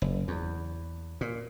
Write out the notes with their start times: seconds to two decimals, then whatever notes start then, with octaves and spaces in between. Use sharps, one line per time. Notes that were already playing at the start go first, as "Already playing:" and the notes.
0.02 F#1
0.28 E2
1.21 A#2